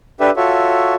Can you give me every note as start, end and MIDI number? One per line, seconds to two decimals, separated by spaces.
0.20 0.30 62
0.20 0.30 67
0.20 0.30 69
0.20 0.30 71
0.20 0.30 76
0.36 0.95 65
0.36 0.95 66
0.36 0.95 69
0.36 0.95 73
0.36 0.95 76